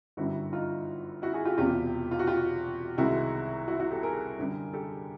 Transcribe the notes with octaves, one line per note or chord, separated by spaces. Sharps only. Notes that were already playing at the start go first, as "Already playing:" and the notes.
G1 F#2 D3 G3 E4 F#4
D#4 F4
E4 F#4
F#4 G#4
F4 G4
E1 E2 C3 F4 G4
F4
F#4
F4 G4
C2 C3 D#3 G#3 E4 F#4
E4 F#4
E4 F#4
G4 A4
G#4 A#4
F#2 D3 G3
G4 A4